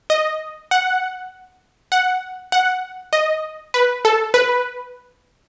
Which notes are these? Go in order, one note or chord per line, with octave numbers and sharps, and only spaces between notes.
D#5
F#5
F#5
F#5
D#5
B4
A4
B4